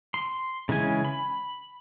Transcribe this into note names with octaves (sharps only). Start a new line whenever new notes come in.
C6
C#3 E3 G#3 C#4 G#5
B5